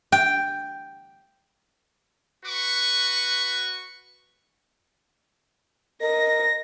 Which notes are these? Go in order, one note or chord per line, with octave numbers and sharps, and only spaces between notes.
G5
F#4 B4 C#6
A#4 D#5 A#6